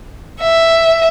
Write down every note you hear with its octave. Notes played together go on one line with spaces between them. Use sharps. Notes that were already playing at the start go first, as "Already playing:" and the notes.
E5